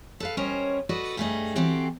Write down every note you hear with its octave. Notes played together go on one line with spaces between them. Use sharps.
A4 B4 F5
G3 C#4 A#4 C5 C#5 D#5
F#4 A4 B4 D5 D#5
G2 G3 A3 C4 G#4 D#5
E3 C4 F#4 G4 A4 C5